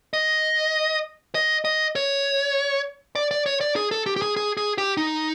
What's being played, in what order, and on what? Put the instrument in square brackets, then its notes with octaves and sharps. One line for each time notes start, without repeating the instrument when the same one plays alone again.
[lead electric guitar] D#5
D#5
D#5
C#5
D5
D5
C#5
D5
G#4
A4
G4
G4
G#4
G#4
G#4
G4
D#4